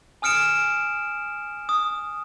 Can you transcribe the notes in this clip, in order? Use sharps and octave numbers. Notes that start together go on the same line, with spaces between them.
G#5 D#6 F6 C#7 D7 E7
D#6